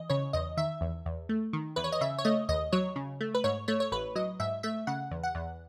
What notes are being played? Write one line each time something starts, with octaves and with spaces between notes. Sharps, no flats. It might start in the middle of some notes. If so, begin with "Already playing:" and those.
Already playing: E3 D#5
C#3 C#5
E2 D#5
D#3 E5
E2
E2
A3
D#3
E2 B4
C#5
D#5
C#3 E5
C#5
A3 D#5
D#2 D#5
F#3 C#5
C#3
A3
B4
G#2 C#5
A3 C#5
C#5
A1 B4
F#3 D#5
G#2 E5
A3 E5
C#3 F#5
E2
F#5
E2